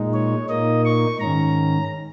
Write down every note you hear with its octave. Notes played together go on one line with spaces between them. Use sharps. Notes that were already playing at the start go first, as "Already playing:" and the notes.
Already playing: A#2 G#3 D#4
C#5
A#2 A#3 D#4 D#5
C#6
G#2 D#3 C#4 A#5